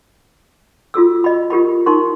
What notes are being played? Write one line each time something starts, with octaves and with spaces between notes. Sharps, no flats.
F4 F#4 A4 E6
D#5 B5
F4 G4 A#4 B5
D#4 A#4 C6 C#6